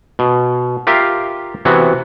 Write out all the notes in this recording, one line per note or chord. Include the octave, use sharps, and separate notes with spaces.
B2
F4 G4 A#4 E5 F5
C3 E3 B3 F#4